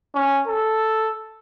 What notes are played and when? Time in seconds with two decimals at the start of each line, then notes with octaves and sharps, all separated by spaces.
0.15 C#4
0.47 A4